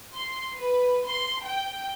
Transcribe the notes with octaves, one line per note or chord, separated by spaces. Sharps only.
C6
B4
C6
G5